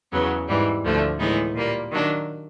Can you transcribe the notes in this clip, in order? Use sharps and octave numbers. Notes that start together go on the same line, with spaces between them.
E2 C#3 F#3 B3
G#2 E3 G3
D2 D3 F3 A3
A2 E3 G#3 B3 D#4
A#2 G3 A#3
D#3 F#3 A#3 D4